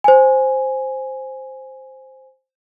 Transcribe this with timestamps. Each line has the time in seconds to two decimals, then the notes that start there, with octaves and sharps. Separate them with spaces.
0.04 C5 G#5